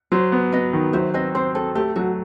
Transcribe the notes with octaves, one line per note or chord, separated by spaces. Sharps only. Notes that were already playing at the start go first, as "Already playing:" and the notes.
F#3 C5
B3
B3 B4 D#5
D#3
F#3 C5 E5
C4 B4 D#5
C4 C5
C4 A4
A3 G4
F#3 F#4